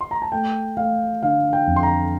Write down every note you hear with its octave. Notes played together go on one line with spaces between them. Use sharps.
C6
A#5
A5
A3 G5
A3 F5
D3 F5
G5
F2
C6
A#5